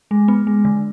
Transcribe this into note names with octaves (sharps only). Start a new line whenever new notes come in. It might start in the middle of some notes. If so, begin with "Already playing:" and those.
G#3
B3
G#3
D3